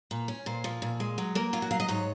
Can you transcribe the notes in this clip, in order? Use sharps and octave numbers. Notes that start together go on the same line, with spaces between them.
A#2
C#4
A#2 C5
F3
A#2
G#3
F#3
A#3 A#4
F#3 F4
F#4
F#3 F5
D#5
G#2 C#5